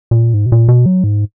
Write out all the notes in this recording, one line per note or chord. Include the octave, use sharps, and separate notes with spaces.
A#2
G#2
B2
A#2
B2
F#3
G#2